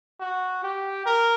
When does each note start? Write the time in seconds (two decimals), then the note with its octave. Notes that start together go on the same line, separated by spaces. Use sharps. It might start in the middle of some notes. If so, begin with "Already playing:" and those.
0.20 F#4
0.63 G4
1.06 A#4